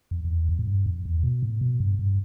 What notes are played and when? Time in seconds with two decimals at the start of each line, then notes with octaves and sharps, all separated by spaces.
0.11 F2
0.25 F2
0.30 E2
0.49 F2
0.59 A2
0.67 G2
0.86 F2
1.05 E2
1.23 B2
1.43 A2
1.61 B2
1.80 G2
1.99 G2